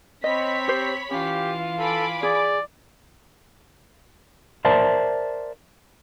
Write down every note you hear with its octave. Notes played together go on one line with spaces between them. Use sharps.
C4 C#5 D#5 B5 B6
G4 C5
E3 C#4 F4 G4 F5
A4 G#5 B5 D6
G#4 D5
A#4 C5 D5 E5 A5